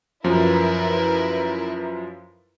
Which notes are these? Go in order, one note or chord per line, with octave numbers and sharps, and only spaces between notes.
F#2 F3 E4 A#4 B4